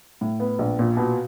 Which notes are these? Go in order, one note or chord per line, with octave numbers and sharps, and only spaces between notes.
A2
B3
A#1
A#2
B2